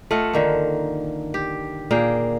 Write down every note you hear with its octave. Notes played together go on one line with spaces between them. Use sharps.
A3 F4 D#5 F#5
D3 D#3 A#3
G4
A#2 A#3 G#4 G5